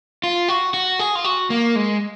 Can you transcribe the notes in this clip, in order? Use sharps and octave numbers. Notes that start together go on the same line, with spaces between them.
F4
F#4
F#4
G#4
F4
F#4
A#3
G#3